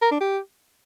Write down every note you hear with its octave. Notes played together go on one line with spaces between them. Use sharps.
A#4
D4
G4